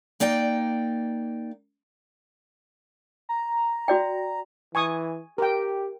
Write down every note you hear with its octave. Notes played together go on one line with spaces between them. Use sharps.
A#3 D#4 D5 G5
A#5
F#4 D5 G5
E3 G#5 C#6 D#6
G4 A#4 G5